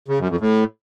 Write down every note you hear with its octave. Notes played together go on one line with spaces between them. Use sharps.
C#3
F#2
F2
A2